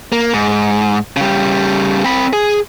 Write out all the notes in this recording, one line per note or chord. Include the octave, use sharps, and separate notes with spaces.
A#3
G#2
C#3 G3
C4 B5
G#4